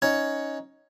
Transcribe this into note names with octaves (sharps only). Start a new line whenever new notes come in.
C#4 D#4 C#5 F#5